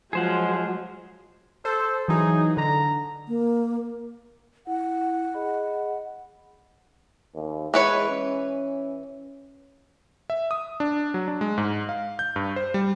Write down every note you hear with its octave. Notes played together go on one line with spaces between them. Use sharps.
F3 F#3 G#3 G#4 C5 F#5
A4 C5
E3 F#3 D#4 G#4
D3 A#5
A#3
E4 F#5
G#4 D#5 B5
D#2
E3 G#3 B4 C#5
C#4
E5
D#6
D4
F#3
D4
G#3
G#2
F5
G6
G2
C5
G3